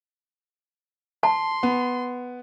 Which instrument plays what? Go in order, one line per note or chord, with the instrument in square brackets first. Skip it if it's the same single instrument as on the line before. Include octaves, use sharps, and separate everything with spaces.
[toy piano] A5 [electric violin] C6
[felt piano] B3